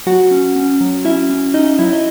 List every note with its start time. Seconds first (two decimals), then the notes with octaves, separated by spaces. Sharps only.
0.06 F#3 F#4 F#5
0.31 C#4
0.56 C#4
0.81 F#3
1.05 C#4 E4 E5
1.30 C#4
1.54 C#4 D#4 D#5
1.79 F#3 E4 E5
1.93 D#5